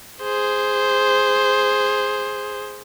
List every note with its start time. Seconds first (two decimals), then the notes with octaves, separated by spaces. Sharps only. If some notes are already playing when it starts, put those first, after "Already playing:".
0.22 G#4 C5